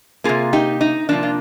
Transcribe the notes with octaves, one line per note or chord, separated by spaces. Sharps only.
C3 F3 A#3 F4 G#4
D#4 G4
D#4
C3 F3 A#3 D4
F4